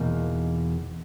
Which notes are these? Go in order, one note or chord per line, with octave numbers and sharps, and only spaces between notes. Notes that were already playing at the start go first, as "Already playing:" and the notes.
Already playing: E2 B2 A#3 D#4